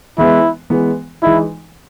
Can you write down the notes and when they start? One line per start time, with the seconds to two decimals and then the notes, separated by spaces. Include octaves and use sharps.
0.18 E3 G#3 B3 E4
0.70 E3 G#3 B3
1.22 E3 G#3 D#4 E4